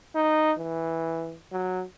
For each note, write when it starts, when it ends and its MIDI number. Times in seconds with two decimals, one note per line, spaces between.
0.15 0.52 63
0.58 1.36 52
1.52 1.83 54